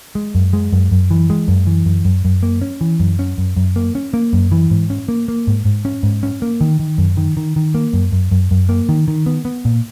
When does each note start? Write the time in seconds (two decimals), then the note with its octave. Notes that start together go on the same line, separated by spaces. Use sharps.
0.15 G#3
0.35 F#2
0.53 G#3
0.72 F#2
0.92 F#2
1.11 E3
1.30 G#3
1.48 F#2
1.67 E3
1.86 F#2
2.05 F#2
2.25 F#2
2.43 A#3
2.61 C#4
2.81 E3
3.00 F#2
3.19 C#4
3.38 F#2
3.57 F#2
3.76 A#3
3.95 C#4
4.14 A#3
4.33 F#2
4.52 E3
4.71 G#2
4.90 C#4
5.09 A#3
5.28 A#3
5.47 G#2
5.65 G#2
5.85 C#4
6.03 G#2
6.23 C#4
6.42 A#3
6.61 D#3
6.80 D#3
6.98 F#2
7.17 D#3
7.37 D#3
7.56 D#3
7.75 A#3
7.93 F#2
8.12 F#2
8.32 F#2
8.51 F#2
8.69 A#3
8.89 D#3
9.08 D#3
9.26 B3
9.45 B3
9.65 A#2